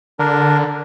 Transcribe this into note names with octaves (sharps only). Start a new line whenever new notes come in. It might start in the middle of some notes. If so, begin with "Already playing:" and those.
D3 D4 A#4